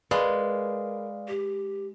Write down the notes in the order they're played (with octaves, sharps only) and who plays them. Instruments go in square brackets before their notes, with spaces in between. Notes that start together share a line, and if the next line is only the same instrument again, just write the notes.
[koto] G#3 [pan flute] A#4 [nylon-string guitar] B4 [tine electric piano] D5 F5
[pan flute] G4